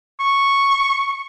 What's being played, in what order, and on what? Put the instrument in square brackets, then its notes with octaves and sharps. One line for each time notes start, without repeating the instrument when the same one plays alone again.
[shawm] C#6